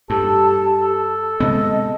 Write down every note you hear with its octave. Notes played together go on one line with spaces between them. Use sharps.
G2 G4 A4 A5
A4
C3 G#3 B3 D#5